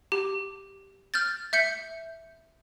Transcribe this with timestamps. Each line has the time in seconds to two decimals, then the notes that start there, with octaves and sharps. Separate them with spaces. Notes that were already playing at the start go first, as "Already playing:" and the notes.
0.12 G4
1.14 F6 G6 A6
1.53 E5 G6 C#7